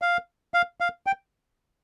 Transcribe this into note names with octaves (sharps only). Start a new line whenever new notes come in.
F5
F5
F5
G5